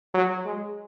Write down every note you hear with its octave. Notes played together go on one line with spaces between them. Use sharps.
F#3
G#3